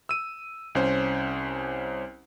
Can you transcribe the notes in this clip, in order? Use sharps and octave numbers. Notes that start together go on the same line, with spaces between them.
E6 D#7
C2 C#4 C5